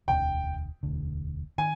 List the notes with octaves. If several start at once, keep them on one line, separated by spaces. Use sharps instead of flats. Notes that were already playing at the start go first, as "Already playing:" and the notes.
E1 D2 D3 G5
E1 D2 D3
D#3 G#5